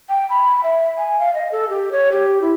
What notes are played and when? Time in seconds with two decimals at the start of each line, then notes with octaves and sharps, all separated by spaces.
0.09 G5
0.30 B5
0.63 E5
0.98 G#5
1.19 F5
1.35 D#5
1.52 A4
1.69 G4
1.92 C#5
2.12 G4
2.42 E4